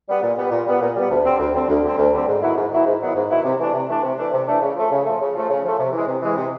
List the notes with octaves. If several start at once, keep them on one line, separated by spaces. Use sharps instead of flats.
G3 B3
A#2
G3 B3
A#2
G3 B3
A#2
G3 B3
D2
D3 G3 C4
D2
D3 G3 C4
D2
D3 G3 C4
D2
D3 G3 C4
G#2
D#3 F#3 B3 E4
G#2
D#3 F#3 B3 E4
G#2
D#3 F#3 B3 E4
G#2
D#3 F#3 B3 E4
C3
E3 A3 D4
C3
E3 A3 D4
C3
E3 A3 D4
C3
E3 A3 D4
C#3
F3 A3
C#3
F3 A3
C#3
F3 A3
C#3
F3 A3
C3
E3 G#3
C3
E3 G#3
C3